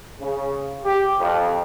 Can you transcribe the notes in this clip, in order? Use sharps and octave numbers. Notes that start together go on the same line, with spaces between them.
C#3
G4
F2